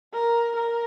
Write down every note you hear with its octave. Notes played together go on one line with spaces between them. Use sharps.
A#4
A#4